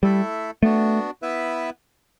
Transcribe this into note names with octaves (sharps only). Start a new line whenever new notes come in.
G3 A3 E4 A4 E5
A3 B3 D4 F#4
B3 E4 B4 E5